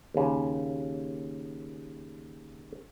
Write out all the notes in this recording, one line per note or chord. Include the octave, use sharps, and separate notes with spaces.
D#2 C#3